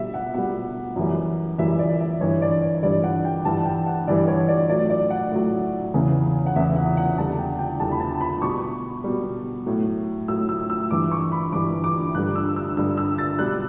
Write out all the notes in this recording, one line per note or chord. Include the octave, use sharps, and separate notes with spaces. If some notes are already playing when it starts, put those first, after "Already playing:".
Already playing: B2 G3 E5
F#5
B2 G3 F#5
F#2 E3 G3
F#2 E3 G3 E5
D5
E5
G2 E3 G3 C#5
D5
D5
G2 E3 G3 D5
F#5
G5
G2 E3 G3 A5
G5
F#5
G2 E3 G3 D5
C#5
D5
A2 F#3 D5
D5
F#5
A2 F#3
E2 C#3 E3
F#5
E2 C#3 E3 E5
F#5
F#5
E2 D3 G3 A5
G5
G5
E2 D3 G3 A5
B5
A5
B5
B2 G3 C#6
B2 G3
A2 F#3
A2 F#3 E6
E6
E6
G2 E3 G3 D6
C#6
B5
G2 E3 G3 D6
D6
G2 D3 G3 F#6
E6
E6
G2 D3 G3 E6
E6
A6
B2 G3 F#6